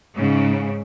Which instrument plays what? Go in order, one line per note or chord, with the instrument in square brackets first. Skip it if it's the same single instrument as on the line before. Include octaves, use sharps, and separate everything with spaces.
[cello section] G#2 C#3